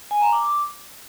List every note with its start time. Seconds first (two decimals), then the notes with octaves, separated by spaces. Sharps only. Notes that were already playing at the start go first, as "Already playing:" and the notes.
0.11 G#5
0.22 A#5
0.33 D6